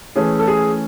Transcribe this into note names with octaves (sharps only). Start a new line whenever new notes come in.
E3 A3 C#4 G#4
A4
G#4